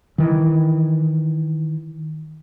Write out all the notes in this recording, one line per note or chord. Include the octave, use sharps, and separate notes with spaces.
D#3 E3